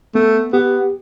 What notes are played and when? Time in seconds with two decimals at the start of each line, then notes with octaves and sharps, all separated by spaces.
0.15 A3 B3
0.53 B3 G4